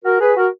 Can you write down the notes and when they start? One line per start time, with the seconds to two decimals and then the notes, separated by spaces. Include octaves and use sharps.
0.05 F#4 A#4
0.21 G#4 B4
0.37 F#4 A#4